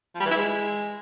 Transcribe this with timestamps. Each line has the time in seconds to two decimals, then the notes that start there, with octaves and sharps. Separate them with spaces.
0.15 F3
0.20 G3
0.25 E3
0.31 E4
0.36 G#3